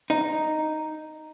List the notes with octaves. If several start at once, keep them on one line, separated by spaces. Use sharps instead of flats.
D#4